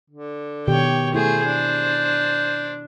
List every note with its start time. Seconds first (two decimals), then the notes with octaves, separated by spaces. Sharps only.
0.10 D3
0.68 B2 D#3 G4 C#5 G5
1.14 A3 E4 G#4 C5
1.46 D4